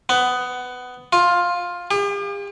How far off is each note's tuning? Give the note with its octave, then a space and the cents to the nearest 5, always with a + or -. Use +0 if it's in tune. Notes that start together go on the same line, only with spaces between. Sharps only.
B3 +15
F4 +10
G4 +45